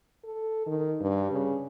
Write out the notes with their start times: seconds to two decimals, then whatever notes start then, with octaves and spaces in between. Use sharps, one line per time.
0.24 A4
0.66 D#3
1.01 G2
1.32 C#3